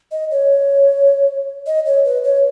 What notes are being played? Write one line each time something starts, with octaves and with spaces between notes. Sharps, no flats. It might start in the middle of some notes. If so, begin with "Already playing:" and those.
D#5
C#5
D#5
C#5
B4
C#5